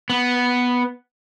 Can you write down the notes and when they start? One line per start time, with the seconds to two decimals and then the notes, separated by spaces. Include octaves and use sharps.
0.10 B3